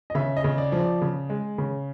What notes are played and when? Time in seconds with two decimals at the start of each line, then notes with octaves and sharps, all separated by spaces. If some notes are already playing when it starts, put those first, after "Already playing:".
0.10 D#5
0.15 C#3 E5
0.37 D#5
0.44 C#3
0.58 D5
0.72 F3
0.79 D5
1.02 C#3
1.30 G#3
1.58 C#3